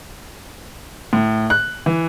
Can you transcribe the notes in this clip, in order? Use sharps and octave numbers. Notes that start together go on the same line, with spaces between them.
A2
F#6
E3